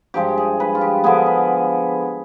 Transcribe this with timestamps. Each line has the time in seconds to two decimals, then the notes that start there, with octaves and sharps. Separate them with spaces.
0.14 G2 F3 G#3 G4
0.38 G#4
0.60 B4
0.75 F4
0.81 G4
1.04 D3 F3 B3 G#4
1.26 B4